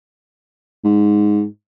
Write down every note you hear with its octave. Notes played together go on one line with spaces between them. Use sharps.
G#2